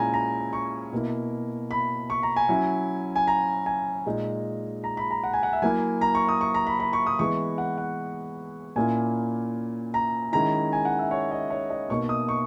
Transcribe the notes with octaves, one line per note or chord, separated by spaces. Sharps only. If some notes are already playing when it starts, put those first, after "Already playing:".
Already playing: A#2 G#3 C#4 E4 G#5 A#5
A#5
C#6
B2 A#3 E4
B5
C#6
A#5
G#5
F#3 C#4 E4
G#5
A#5
G#5
A#2 G#3 D#4
A#5
B5
A#5
F#5
G#5
F#5
E5
F#3 A#3 E4 G#5
A#5
C#6
D#6
C#6
A#5
B5
B5
C#6
D#6
E3 G#3 B3 E4 C#6
F#5
F#5
A#2 A#3 C#4 E4 G#5
A#5
D#3 G#3 C#4 E4 A#5
G#5
F#5
E5
C#5
D#5
C#5
D#5
B2 A#3 D#4 C#6
D#6
C#6